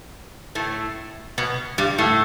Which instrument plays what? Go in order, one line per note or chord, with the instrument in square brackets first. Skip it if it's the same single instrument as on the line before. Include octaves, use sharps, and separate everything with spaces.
[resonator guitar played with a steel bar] A2 A3
B2 B3
G2 G3
A2 A3